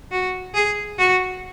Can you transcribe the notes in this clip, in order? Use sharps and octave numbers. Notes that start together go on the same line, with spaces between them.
F#4
G#4
F#4